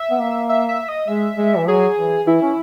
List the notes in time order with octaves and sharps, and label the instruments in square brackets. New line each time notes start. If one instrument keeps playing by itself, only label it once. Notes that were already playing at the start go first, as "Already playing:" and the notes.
Already playing: [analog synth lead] E5
[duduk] B3
A#3
[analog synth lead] E5
E5
D#5
[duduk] G#3 [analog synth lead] E5
[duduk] G#3
E3
[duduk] F#3 [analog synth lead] G#4
[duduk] E3
[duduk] E3 [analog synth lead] E4
[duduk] C#4